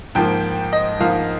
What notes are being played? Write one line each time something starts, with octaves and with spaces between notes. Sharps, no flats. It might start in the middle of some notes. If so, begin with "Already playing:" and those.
G#2 F3 A#3 G5
D#5
G#2 F3 A#3 F5